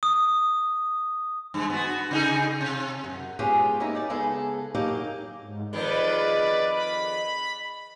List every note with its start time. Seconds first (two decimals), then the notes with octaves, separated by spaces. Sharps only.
0.03 D#6
1.54 G2 G#3
1.70 B3 F#4
2.11 C#3 D#4 G#4
2.61 C3
3.04 F#2
3.39 G#3 B3 C#4 F4 G4 G#4
3.80 A#3 C#4 D#4 E4 F#4 G4
3.95 D#4 D5
4.10 C#3 G#3 B3 G#4 A4
4.75 F#3 A#3 D#4 G4
5.38 G#2
5.73 F2 D#3 G#3 B4 D5
6.71 B5